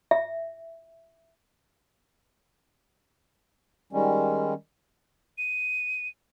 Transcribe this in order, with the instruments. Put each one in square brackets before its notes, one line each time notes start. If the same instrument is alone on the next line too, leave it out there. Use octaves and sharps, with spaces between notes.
[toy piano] E5
[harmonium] D#3 G3 G#3 C#4
[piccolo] D#7